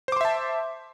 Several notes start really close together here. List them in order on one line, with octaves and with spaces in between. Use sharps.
C5 D6 C6 E5 A5